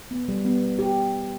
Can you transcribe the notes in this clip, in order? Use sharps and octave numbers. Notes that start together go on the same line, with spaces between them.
B3
G3
B3
G4